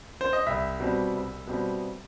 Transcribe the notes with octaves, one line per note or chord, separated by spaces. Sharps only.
C5
D#5
C2 E5
B2 G3 C4
C2
B2 G3 C4